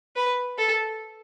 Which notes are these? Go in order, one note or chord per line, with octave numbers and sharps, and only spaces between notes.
B4
A4